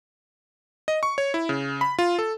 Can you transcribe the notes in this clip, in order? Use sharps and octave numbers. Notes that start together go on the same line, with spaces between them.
D#5
C#6
C#5
E4
C#3
B5
F4
A4